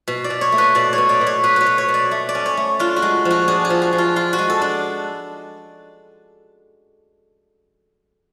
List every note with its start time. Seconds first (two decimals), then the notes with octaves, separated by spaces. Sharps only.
0.08 B2
0.24 D5
0.30 B2
0.41 C#5
0.52 A3
0.58 B4
0.75 B2 D5
0.93 C#5
0.98 B2
1.09 D5
1.21 B2
1.27 C#5
1.43 B2 B4
1.56 B4 C#5
1.66 B2
1.78 C#5
1.88 B2
1.94 D5
2.11 A3
2.29 D5
2.35 C#4
2.46 C#5
2.57 A3
2.79 D4 F4
2.96 F#4
3.02 G#3
3.25 F3
3.31 F#4
3.48 D4 G#4
3.65 G#4
3.70 F3
3.82 F#4
3.93 F3
3.98 F4
4.16 D4 F4
4.33 F#4
4.39 G#3
4.50 A4
4.62 D4